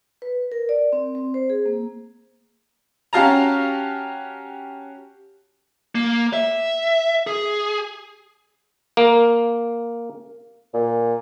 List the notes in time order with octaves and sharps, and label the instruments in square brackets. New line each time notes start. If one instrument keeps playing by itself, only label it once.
[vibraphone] B4
A#4
D5
C4
C4
C5
G#4
A#3
[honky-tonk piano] C#4 F#4 G4 F5 A5 A#5
[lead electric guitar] A#3
E5
G#4
[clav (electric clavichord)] A#3
[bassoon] A#2